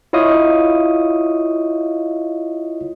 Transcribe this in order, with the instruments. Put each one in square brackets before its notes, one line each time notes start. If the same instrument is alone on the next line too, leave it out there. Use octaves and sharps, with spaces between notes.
[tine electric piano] E4 F4 C#5 D#5 F5 D#6